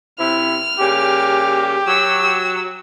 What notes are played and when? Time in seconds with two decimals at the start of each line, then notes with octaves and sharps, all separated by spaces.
0.20 C3 E4 F6
0.80 C#3 G3 A#3 G4
1.88 F#3 E6